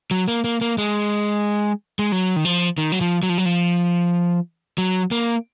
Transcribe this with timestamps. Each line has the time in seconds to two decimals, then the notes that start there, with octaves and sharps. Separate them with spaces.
0.11 F#3
0.28 A#3
0.44 A#3
0.61 A#3
0.78 G#3
1.99 G#3
2.12 F#3
2.36 D#3
2.45 F3
2.78 D#3
2.92 F#3
3.01 F3
3.23 F#3
3.29 F3
3.38 F#3
3.46 F3
4.78 F#3
5.11 A#3